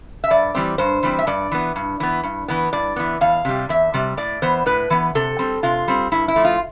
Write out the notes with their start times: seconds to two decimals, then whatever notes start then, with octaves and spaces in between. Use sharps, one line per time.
0.24 E5
0.30 G2 D5
0.55 E3 G3 C4
0.78 G2 C5
1.03 E3 G3 C4
1.19 E5
1.27 G2 D5
1.52 E3 B3
1.76 G2
2.00 E3 B3
2.23 G2
2.48 E3 B3
2.73 G2 D5
2.96 E3 B3
3.21 E2 F5
3.45 C3 G3
3.69 E2 E5
3.94 C3 G3
4.17 A2 D5
4.42 E3 B3 C5
4.66 A2 B4
4.90 E3 B3
5.15 C3 A4
5.39 G3 C4
5.63 C3 F4
5.88 G3 C4
6.12 G2 E4
6.28 E4
6.36 F3 A3
6.45 F4